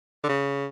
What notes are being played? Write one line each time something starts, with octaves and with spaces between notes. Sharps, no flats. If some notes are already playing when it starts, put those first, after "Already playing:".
D3
C#3